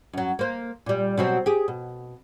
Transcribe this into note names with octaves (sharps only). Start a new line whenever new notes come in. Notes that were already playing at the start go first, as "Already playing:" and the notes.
F#2 F#3
A#3 C5
A#2 G3
B2 F#3 C4
G4 G#4
B2